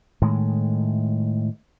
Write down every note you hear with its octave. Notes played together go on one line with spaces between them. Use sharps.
A2 D#3 G#3